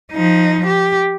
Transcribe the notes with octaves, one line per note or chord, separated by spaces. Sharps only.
F3 D#4
G4